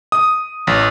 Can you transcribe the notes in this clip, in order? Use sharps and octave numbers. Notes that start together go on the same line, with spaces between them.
D#6
A1